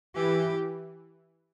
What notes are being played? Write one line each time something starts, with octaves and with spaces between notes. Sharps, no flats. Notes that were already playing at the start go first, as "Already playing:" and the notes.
E3 G4